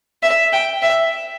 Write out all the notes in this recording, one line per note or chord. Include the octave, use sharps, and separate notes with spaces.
E5
G5
E5